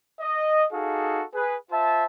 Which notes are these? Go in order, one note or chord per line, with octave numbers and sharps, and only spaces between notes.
D#5
D#4 F#4 G#4 A4 F5
G#4 B4
F4 C5 E5 A5